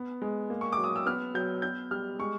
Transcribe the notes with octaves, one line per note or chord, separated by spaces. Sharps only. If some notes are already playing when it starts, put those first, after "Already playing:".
Already playing: B3
G#3
A#3
C#6
D6
F#3
D#6
E6
B3 F6
F#3 G6
B3 G6
G3 F6
G#3 C#6